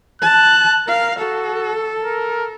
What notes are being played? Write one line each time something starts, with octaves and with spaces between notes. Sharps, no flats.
A5 F#6
A#4 F5
F#4 A4
A#4